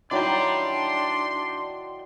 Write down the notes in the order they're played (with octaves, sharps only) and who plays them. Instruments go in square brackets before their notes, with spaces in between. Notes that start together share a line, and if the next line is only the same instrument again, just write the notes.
[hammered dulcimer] D#3 F#3 E4 [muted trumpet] D4 [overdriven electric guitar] D5 G5 [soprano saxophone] C6